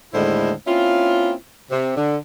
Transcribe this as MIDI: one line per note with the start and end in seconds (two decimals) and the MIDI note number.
0.14 0.52 39
0.14 0.52 45
0.14 0.52 50
0.14 0.52 56
0.14 0.52 64
0.14 0.52 72
0.66 1.32 58
0.66 1.32 60
0.66 1.32 61
0.66 1.32 64
0.66 1.32 65
1.71 1.93 48
1.97 2.17 50